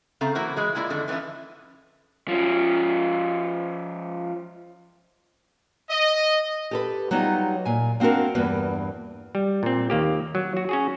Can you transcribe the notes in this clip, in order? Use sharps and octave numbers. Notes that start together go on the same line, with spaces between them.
C#3 A3 C4 F5 A#5
E3 F#3 A#3 E4 F#4 C5
E3 G#3
G#3 A#3 E4 F4 D5
F2 D3 D#3 A3
E3 F3 B3 C#4 E4
F3 C#4
D#5
G4 A4 B4
F#3 G3 B3 D#4 F4
A#2 G#5
A#3 C4 D4 F#4 A#4
E2 G2 A#3 B4
G3
A#2 C4
D#2 A#3 G4
F#3
F#4
C#4 F#4 G#4